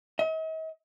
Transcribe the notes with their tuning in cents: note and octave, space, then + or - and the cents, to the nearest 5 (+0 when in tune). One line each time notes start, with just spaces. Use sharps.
D#5 +45